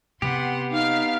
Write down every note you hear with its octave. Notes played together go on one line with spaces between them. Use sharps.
C3 B3 G4 F#5 C6
D#4 F5 F6